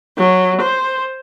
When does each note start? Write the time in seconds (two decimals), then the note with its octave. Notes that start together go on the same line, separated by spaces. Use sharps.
0.16 F#3
0.61 C5